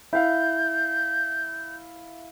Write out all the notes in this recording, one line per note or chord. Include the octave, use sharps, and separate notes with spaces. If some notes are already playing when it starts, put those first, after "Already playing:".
E4 F5 G6